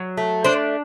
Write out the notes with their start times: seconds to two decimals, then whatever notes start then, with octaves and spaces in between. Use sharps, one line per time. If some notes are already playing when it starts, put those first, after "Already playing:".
Already playing: F#3
0.17 A3
0.44 D4 C5